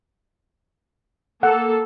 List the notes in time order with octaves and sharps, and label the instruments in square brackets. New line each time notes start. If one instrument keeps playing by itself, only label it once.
[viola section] A#3 A4 [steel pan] F#5